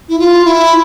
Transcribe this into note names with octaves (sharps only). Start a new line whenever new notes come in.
E4
F4
E4